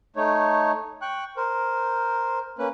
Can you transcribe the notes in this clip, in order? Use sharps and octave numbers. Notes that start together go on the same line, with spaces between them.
A3 D#4 C#5
G5 C#6 F#6
A#4 C5
A#3 C#4 B4